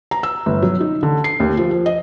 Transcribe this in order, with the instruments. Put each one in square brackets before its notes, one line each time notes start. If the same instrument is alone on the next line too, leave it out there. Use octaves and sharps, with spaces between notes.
[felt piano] A#5
E6
G1
F#3
D#4
D3
C7
D#2
F3
F3
D#5